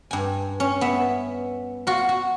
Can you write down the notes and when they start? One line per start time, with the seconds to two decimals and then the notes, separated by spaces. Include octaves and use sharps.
0.11 G2 G#5
0.60 C#4
0.81 B3 E5
1.87 F4 F#4
2.09 F#4